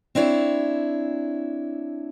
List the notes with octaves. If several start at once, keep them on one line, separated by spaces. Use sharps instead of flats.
C4 D4 E4 C#5